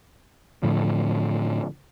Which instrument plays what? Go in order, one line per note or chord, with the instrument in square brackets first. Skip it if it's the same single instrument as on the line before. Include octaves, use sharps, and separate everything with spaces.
[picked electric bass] A2 D3 F3